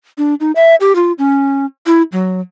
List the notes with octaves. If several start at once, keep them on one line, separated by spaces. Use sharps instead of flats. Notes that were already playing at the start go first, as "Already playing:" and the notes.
D4
D#4
E5
G4
F4
C#4
E4
F#3